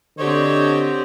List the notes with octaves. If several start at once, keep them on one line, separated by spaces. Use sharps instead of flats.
D3 C4 G4 C5 C#5 D#5